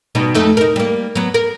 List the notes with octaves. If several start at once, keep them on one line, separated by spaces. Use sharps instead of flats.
B2 G3 D#4
F2 A3 D#4
D#4 A#4
G3 A#3
F#3 B3
A#4